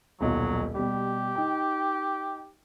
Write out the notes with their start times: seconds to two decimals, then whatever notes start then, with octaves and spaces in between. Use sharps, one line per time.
0.21 D#1 B1 F#3 F4
0.75 B2 G3 G4
1.35 D#4 G5